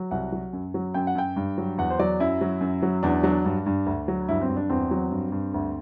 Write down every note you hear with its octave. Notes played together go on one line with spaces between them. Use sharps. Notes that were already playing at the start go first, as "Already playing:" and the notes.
Already playing: F#3
C2 F#5
F#3
F#2
F#3
F#2 G5
F#5
F#2 G5
G2
F#3
E2 F#5
C5
F#3 D5
F#2 E4
F#3
F#2
F#3
E2 D4
F#3 D4
G2 D4
G2
D2
F#3
G2 E4
C4
G2
D4
E2 C4
F#3
G2
G2
D2